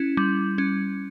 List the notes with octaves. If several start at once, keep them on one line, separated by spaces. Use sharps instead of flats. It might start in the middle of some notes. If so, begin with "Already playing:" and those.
Already playing: C#4 E4
G3
C#4